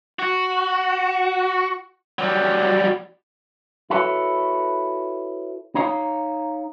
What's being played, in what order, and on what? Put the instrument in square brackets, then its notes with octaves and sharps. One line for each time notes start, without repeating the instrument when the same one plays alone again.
[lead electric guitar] F#4
F#3 G3
[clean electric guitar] E4 F#4 A4 B4 C#5
D#4 C#5 F5 A#5